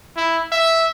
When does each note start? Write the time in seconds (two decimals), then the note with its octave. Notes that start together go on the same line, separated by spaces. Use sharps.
0.17 E4
0.52 E5